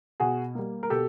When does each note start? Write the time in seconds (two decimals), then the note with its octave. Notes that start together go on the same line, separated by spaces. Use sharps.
0.20 B2 F#4 G#4
0.55 G3 A#3
0.83 A#4
0.90 B2 G4 A4